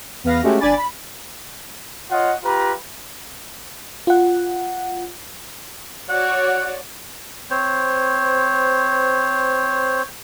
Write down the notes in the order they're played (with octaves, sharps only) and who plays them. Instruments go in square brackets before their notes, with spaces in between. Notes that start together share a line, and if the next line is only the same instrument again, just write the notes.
[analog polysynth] E2 B3 B4 F5 A#6
G#3 A3 C#4 F#4 G4
G1 D4 D5 G#5 B5 A6
B5
[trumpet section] F4 C#5 D#5 F#5
F4 G4 B4 A#5
[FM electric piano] F4 F#5
[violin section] F#4 C#5 D5 [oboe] F#5
[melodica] C4 C5 C#5